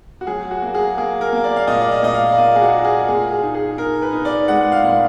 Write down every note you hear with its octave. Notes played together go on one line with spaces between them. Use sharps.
F#4
F#3 G#4
F#4
A#3
G#4
A#3 G#4
A#4
A#3
D5
F5
A#2 D#5
D5
D#5
A#2 D#5
F5
D5
A#3 D#5
G#4
F#4
F4
G#4
A#2 G#4
G#4
D#4
G#4
D#4 A#4
B4
D#4
D5
G#3 F#5
F5
A#2